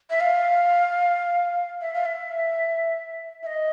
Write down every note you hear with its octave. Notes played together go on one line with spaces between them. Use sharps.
E5
F5
E5
F5
E5
E5
D#5